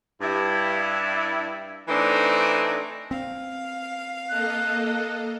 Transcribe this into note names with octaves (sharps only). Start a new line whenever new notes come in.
G2 E4
E3 A3 C4 D4 D#4
C4 F5
A#3 A4 D#5 F#6